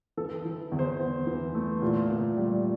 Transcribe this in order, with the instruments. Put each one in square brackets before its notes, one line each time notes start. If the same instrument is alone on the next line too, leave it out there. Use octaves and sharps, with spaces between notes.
[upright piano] E3 A4
E3
E2
C5
E2
E3
A3
A#2
A#2
G3